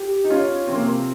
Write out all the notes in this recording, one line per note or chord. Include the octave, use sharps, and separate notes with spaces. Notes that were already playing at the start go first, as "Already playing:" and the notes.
Already playing: G4
D#4
C#4 F4
C3 F3 C4
A#3
C4